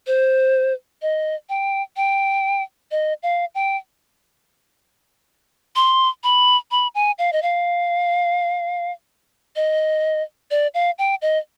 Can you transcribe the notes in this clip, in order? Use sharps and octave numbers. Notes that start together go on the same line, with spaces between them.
C5
D#5
G5
G5
D#5
F5
G5
C6
B5
B5
G#5
F5
D#5
F5
D#5
D5
F5
G5
D#5